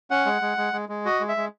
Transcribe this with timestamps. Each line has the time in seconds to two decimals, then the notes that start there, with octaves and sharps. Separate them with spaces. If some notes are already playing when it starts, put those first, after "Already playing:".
0.11 C#4 F#5
0.26 G#3
0.42 G#3
0.57 G#3
0.73 G#3
0.89 G#3
1.05 F#4 D#5
1.20 G#3
1.29 E5
1.37 G#3